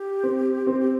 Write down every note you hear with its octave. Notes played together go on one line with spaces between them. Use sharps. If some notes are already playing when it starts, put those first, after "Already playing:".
Already playing: G4
C4
C4
G4